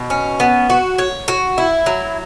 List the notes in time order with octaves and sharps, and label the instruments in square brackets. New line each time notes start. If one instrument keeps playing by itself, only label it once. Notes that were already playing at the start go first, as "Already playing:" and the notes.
Already playing: [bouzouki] B2
C#4
B3
F#4
C#5
F#4
E4
F#3